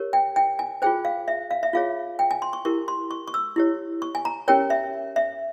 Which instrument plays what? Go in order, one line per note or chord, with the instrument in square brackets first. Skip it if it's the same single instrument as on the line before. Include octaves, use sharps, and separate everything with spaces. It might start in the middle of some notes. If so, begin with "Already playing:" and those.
Already playing: [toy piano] G4 A#4 C#5
G5
G5
G#5
F4 G#4 C5 G5
F5
E5
F5
E5
F4 G#4 C#5 F5
G5
G#5
C6
C#6
E4 G4 A#4 C#6
C6
C#6
C#6
E6
E4 G4 C#5
C#6
G#5
A#5
C#4 G4 A#4 C#5 G5
E5
E5